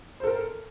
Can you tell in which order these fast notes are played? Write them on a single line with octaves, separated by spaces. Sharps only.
C5 A4 A#4